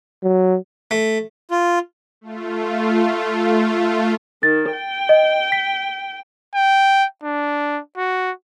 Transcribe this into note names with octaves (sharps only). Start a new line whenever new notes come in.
F#3
A3
F4
A3 F4
D#3 A6
G5
D#5
B6
G5
D4
F#4